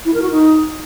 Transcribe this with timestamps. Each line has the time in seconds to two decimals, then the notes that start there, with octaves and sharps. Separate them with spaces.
0.05 E4
0.13 A#4
0.22 F#4
0.30 D#4